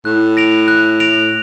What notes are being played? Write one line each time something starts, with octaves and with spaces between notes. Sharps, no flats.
A2 F#6
A#6 D7 F7
F#6
A#6 D7 F7